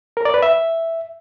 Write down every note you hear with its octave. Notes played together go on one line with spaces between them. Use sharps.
A#4
D5
B4
E5